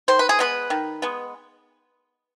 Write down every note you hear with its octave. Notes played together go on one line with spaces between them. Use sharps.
D#3 C5
B4
G#4
G#3 B3 B4
D#3
G#3 B3